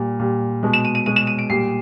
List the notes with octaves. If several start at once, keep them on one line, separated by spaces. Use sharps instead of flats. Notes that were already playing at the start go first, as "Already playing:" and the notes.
Already playing: A#2 G3
A#2 G3
B2 G#3
E7
D#7
D#7
B2 G#3 D#7
E7
D#7
D7
A#2 G3 C7